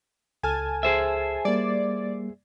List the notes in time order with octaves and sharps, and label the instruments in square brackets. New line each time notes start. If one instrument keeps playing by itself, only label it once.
[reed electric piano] C#2 A4 F6 [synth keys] G#5 A5
[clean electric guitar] G#4 C5 E5
[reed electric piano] G3 A#3 [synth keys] D5